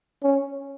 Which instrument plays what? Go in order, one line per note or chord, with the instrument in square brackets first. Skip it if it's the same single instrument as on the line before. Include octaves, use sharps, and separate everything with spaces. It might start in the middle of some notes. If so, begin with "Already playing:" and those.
[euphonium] C#4